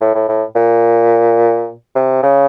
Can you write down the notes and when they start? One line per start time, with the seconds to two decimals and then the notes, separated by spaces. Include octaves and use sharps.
0.01 A2
0.15 A2
0.29 A2
0.56 A#2
1.95 C3
2.23 C#3